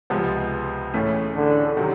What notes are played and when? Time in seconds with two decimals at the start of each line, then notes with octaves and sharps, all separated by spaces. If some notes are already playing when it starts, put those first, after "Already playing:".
0.10 C#2 C3 F3 G#3 B3
0.94 A2 E3 A3 C#4
1.35 D3
1.77 C3 D#3 F#3